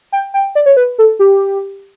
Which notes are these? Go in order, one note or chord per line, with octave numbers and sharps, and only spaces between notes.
G5
G5
D5
C#5
B4
A4
G4